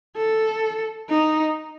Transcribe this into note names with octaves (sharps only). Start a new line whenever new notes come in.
A4
D#4